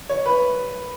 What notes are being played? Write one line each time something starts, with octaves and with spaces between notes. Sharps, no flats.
C#5
B4